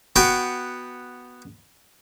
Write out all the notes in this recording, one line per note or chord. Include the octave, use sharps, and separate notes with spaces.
B3 F#4 G5